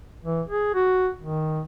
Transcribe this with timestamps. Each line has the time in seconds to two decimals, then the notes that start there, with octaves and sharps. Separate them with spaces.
0.25 E3
0.48 G#4
0.75 F#4
1.21 D#3